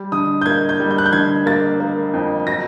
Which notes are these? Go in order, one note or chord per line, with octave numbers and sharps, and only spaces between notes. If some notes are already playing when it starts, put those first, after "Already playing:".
Already playing: G3
D3 D#6
G6
A#3 G#6
G6
G3
G6
F#6
G6
D3 G#6
A#3 A6
A#3
F2
F#3 A#6